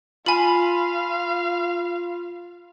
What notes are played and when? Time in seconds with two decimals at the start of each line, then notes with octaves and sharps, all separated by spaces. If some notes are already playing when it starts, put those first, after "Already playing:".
0.26 F4 F5 G#5 B5 F#7